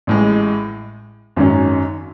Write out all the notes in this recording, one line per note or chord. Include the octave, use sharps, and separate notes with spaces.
A1 A2 G#3
G#1 F#2 D#3 F#3 C#4